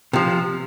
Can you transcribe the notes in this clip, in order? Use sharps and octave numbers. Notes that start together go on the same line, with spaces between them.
C3 F3